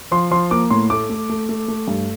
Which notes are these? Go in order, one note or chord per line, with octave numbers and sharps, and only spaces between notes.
F3 C6
F3 C6
A#3 D6
A2 C6
A3 D6
A3
A3
A3
A3
G2